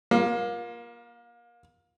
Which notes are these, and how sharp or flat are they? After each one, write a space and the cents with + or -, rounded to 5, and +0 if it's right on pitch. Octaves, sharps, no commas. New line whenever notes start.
A#3 +30 F4 +0